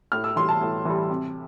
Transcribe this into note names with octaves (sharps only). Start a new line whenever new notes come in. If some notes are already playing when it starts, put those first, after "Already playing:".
A2 F6
E6
E3 G3 C6
A5
A2
E3 G3
C3